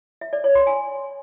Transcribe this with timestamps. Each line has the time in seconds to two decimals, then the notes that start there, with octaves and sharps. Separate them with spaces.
0.21 E5
0.33 D5
0.44 C#5
0.55 C6
0.67 G#5